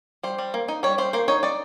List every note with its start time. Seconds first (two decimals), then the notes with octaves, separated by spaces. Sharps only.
0.23 G3 C5
0.38 G3
0.54 A#3
0.68 D#4
0.83 G3 C#5
0.98 G3 C5
1.13 A#3 C5
1.28 D#4 C#5
1.43 D#4 D5